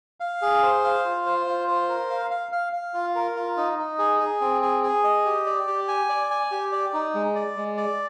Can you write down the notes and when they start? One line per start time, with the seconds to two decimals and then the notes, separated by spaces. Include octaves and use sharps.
0.20 F5
0.42 G#4
0.63 C5
0.84 F5
1.05 F4
1.26 C5
1.46 F4
1.68 C5
1.89 A#4
2.10 F5
2.31 F5
2.52 F5
2.73 F5
2.94 F4
3.15 A#4
3.36 F4
3.57 D#4
3.78 D#4
3.99 G#4
4.20 G#4
4.41 C4
4.62 G#4
4.83 G#4
5.04 D#5
5.25 G4
5.46 D5
5.67 G4
5.88 G#5
6.09 D5
6.30 G#5
6.51 G4
6.72 D5
6.93 D#4
7.14 G#3
7.35 D5
7.56 G#3
7.77 D5